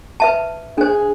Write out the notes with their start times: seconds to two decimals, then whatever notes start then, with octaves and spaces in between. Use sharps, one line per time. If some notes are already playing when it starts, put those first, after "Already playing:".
0.20 B4 E5 A5
0.78 D4 G#4 C5